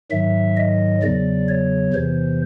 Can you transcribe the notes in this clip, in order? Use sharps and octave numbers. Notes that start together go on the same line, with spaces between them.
G#2 D#3 F#3 E5
D#5
E2 C#3 F#3 D5
C#5
E2 C3 E3 C5